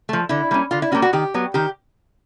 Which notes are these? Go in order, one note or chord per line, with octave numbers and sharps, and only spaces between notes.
F3 A3
D3 E4
G3 A#3 C#4
D3 F4
E4
G3 A#3 C#4 F#4
F#4
D#3 G4
F#3 B3
D#3 G4